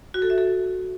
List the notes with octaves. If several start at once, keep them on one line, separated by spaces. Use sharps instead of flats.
F#4
A4
E5
A4